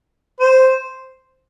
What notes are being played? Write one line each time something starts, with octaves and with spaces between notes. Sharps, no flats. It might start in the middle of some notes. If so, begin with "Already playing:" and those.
C5